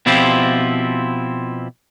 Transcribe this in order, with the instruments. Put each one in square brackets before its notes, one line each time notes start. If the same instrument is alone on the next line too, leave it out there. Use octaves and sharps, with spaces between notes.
[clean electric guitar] B2 F3 C4 E4 F4 G4